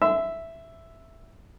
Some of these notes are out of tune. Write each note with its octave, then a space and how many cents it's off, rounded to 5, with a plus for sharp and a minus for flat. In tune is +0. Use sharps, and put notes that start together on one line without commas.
E5 +0 C6 -45 E6 +0